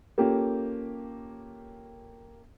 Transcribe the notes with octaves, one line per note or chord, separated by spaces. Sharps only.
A#3 C#4 F4 G4 A4